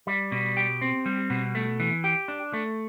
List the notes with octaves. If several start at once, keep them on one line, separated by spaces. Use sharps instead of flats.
G3
B2
G4
C4
G3
B2
A3
E3
G4
D4
A3